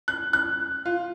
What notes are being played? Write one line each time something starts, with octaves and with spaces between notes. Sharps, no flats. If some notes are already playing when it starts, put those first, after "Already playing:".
F#6
F#6
F4